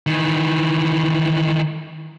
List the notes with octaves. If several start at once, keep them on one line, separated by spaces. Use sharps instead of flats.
D#3 E3